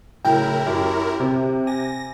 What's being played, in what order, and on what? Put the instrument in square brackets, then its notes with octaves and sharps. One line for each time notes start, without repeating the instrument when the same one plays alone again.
[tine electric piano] A2 C#3 F#3 [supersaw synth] E4 A#4 [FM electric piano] G5
[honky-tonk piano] F#2 [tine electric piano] G4
[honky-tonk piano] C3
[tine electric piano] G#5 [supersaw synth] A#6